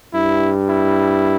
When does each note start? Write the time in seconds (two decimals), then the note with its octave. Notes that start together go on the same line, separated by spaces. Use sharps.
0.14 G2 E4
0.69 E4